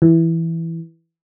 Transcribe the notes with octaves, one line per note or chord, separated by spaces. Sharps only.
E3